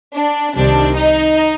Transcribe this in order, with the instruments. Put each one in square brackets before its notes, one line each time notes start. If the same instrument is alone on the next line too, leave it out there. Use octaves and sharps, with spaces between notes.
[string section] D4
C2 C3 D#3 G3 D4
D#4